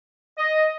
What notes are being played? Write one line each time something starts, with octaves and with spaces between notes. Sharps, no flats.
D#5